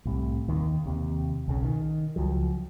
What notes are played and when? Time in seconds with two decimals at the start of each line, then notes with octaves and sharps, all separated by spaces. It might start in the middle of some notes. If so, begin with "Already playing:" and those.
0.05 C2 A2 C3
0.48 D#2 D#3
0.86 D#2 C3
1.48 B1 C#3
1.65 D#3
2.16 C#2 F3 F#3